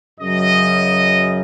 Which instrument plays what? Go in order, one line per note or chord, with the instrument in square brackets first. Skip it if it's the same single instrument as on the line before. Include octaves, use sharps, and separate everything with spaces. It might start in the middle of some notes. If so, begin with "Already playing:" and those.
[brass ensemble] F#2 C#3 F#3 D#5